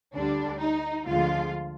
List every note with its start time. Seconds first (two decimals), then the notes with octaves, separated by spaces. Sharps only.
0.14 D2 D3 G3 D4
0.60 D#4
1.07 D2 D3 F3 G#3 F4